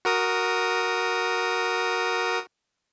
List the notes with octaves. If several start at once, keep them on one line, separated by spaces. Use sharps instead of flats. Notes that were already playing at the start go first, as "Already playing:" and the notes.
F#4 A#4 D#6